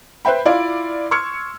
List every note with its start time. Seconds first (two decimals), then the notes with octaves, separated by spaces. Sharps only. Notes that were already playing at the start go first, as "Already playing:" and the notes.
0.25 B4 C5 E5 G5 B5
0.45 E4 F4 D5 F5
1.11 C6 C#6 E6 F6 G#6 C#7